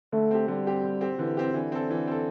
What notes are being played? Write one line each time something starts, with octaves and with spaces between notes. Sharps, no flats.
D3 A3
C4 G4
D3 G3
C4 G4
D3
C4 G4
D3 E3
C4 G4
D3 E3
C4 A4
E3
C4 A4